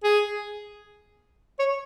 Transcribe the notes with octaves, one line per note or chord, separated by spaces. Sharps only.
G#4
C#5